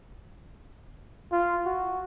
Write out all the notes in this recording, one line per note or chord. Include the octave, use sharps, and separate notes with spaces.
F4
F#4